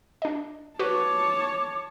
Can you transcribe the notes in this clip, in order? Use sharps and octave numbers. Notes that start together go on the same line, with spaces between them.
D4 D#5
F#4 B4 C#5 A5 D6